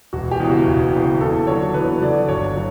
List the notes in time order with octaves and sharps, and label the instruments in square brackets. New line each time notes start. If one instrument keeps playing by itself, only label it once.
[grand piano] E1 F#4
G4
E2 C#3
F#4
E1
E2 C#3
E2 A4
D3 F#3 C#5
E2 B4
D3 F#3 D5
G1 C#5
F#3